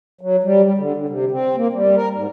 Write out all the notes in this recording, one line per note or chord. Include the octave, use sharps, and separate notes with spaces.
F#3
G3
G3
D3
D3
C3
C4
A#3
G3
A#4
G#2